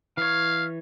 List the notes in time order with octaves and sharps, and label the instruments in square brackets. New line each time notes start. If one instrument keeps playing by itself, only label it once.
[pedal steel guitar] E3 C#5 [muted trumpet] F5